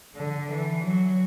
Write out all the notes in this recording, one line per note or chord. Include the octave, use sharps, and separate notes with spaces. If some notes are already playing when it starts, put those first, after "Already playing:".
D3
E3
F#3